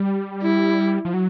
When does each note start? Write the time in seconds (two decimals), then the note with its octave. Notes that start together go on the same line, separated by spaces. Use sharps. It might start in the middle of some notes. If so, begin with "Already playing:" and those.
Already playing: G3
0.43 E4
1.05 F3
1.14 F#3